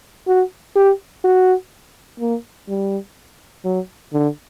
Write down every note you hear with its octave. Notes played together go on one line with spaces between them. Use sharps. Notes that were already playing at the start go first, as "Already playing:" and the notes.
F#4
G4
F#4
A#3
G3
F#3
D3